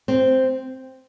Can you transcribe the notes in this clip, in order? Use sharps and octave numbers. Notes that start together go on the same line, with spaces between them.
C4